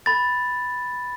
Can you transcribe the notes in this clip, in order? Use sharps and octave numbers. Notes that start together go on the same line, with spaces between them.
B5 A6